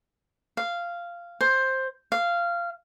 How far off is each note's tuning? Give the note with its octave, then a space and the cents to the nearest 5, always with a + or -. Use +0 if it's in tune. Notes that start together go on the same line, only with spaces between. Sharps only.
F5 -10
C5 +10
F5 -15